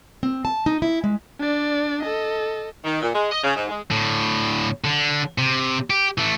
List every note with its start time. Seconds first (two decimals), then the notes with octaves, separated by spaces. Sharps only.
0.23 C4
0.45 A5
0.66 D#4
0.82 E4
1.04 G#3
1.39 D4 D5
2.03 A4 D#5
2.84 D#3
3.02 A#2
3.14 G#3
3.31 D#5
3.43 C#3
3.55 G#2
3.68 G#3
3.91 A2 D3
4.84 D3
5.38 C3
5.90 G4
6.18 E3 A3